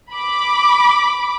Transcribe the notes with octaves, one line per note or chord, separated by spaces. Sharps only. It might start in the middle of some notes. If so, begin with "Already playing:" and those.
B5 D6